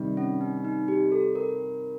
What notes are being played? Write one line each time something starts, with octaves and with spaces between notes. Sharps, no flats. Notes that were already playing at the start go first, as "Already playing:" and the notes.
Already playing: C3 D#3 G3
C#4
D#4
D#4
G4
A4
A#4